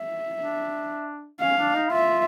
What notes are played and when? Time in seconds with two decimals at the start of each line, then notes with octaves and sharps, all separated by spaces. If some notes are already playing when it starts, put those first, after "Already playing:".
Already playing: E5
0.37 D4
1.40 C#4 F5
1.57 D4
1.74 D#4
1.91 F4 E5